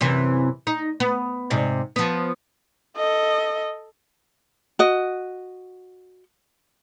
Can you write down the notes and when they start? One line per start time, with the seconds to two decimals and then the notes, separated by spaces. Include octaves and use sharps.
0.01 F#2 C3 E3
0.67 D#4
1.00 B3
1.50 G#2 C3 D5
1.96 F3 B3
2.97 A4 D#5
4.79 F#4 D#5